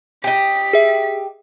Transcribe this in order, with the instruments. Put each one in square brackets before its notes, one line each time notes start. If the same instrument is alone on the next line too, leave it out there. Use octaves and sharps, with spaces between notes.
[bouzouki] G4 D#5 [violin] B6
[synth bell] G#4 E5